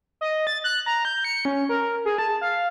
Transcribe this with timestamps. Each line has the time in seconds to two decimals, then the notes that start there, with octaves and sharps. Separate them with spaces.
0.21 D#5
0.47 A6
0.64 F#6
0.86 A#5
1.05 G6
1.24 C#7
1.45 C#4
1.69 A#4
1.81 A#4
2.05 G#4
2.18 A5
2.41 F5